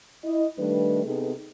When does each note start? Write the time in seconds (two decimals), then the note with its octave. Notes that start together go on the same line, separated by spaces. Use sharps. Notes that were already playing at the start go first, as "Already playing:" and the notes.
0.25 E4 D#5
0.58 D#3 G3 A3 D4 B4
1.06 C3 B3 D#4 G#4 A4 B4